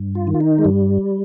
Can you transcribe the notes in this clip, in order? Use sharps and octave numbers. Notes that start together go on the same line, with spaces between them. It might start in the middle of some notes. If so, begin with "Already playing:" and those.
Already playing: G2
F4
D#3
F4
D#4
G#3
G2 G3